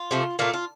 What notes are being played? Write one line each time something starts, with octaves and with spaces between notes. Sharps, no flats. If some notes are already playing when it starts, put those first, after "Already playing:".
Already playing: F4
C3 F3 A3
A#2 A3 F4
F4